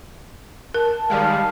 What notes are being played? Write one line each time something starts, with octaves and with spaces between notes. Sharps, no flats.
A#4 A5
D#3 G3 G#3 F5